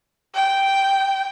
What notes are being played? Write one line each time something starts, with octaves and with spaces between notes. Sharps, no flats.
G5